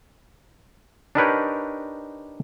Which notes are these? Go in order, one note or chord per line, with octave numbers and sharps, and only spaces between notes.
D4 D#4 G4 A#4 B4 C#5